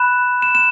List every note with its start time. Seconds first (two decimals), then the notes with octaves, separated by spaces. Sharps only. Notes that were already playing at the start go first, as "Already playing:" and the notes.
Already playing: B5 F#6 E7
0.42 E7
0.55 E7